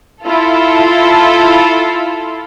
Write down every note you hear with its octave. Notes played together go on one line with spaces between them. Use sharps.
E4 F4 A4